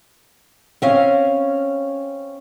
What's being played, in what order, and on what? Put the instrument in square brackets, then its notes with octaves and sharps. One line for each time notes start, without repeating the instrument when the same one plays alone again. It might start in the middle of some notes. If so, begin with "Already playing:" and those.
[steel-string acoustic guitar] C4 C#4 F5